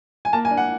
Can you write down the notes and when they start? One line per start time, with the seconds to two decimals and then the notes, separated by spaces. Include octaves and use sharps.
0.25 G#5
0.33 A#3 A5
0.45 G#5
0.51 D4
0.57 F#5